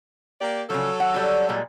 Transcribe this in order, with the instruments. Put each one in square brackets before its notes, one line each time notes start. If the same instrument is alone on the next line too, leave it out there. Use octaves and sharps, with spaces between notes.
[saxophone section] A#3 G4 D5
[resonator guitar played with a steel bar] C#3 F3 [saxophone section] F#3 A4
[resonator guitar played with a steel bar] F#5
G3 F#4
A#2 G3 G#3